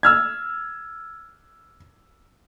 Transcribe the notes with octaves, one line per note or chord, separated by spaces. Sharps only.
E6 F6 G#6